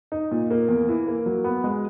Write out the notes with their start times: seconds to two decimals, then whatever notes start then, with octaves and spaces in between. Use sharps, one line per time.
0.12 D#4
0.31 A#2
0.51 A#3
0.68 E2
0.88 E3
1.08 A#3
1.26 F#3
1.44 B3
1.64 G#3